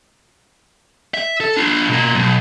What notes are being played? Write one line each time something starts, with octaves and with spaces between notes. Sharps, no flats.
E5
A4
D4 F4
B2 A#3
B1 F#2